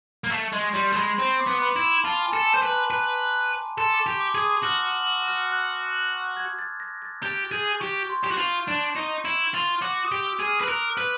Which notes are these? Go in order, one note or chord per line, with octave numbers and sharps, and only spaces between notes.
A#3
A3 C#6
G#3 C6
G3 C6
A3
G#3 B5
C4 C6
D6
B3
B5
E4
B5
F4 A5
G#5
A4
A5
C5
B4
A#5
B4 A#5
A4 C6
D6
C#6
G4
D6
G#4
D#6
F#4 F6
F6
E6
F6
F#6
G#6
A6
A#6
A6
G4 A6
G#4 G6
G4 C#6
C6
G4
F#4
F4
D4
D#4 C#6
E4
F4
F#4 D6
D#6
G4
E6
G#4
F6
B4
A#4 F#6
B4